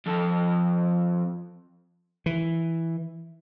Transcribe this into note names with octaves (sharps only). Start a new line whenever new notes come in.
F2 A4
E3